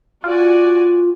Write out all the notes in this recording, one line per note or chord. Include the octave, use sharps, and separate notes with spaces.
F4 F#4 D5 G#5